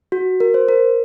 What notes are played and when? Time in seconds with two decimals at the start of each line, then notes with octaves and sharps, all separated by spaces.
0.12 F#4
0.40 A#4
0.54 C5
0.69 A#4